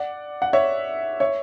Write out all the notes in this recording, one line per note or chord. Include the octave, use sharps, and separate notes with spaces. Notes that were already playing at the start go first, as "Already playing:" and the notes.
Already playing: D5 F#5
F#5
C#5 E5
C#5 E5